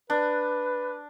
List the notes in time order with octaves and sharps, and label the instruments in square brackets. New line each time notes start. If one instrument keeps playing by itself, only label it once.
[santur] D4 [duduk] B4